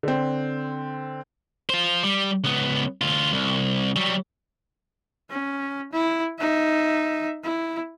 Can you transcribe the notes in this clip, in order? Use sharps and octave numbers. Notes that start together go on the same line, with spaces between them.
D3 C4
F4 C5
G3
C#2 B3
D2 F4
C2
F#3 G3
C#4
E4
D#4 E5
E4